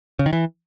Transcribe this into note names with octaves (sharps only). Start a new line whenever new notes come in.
C#3
D#3
E3